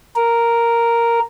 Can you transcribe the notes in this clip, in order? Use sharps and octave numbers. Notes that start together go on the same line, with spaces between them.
A#4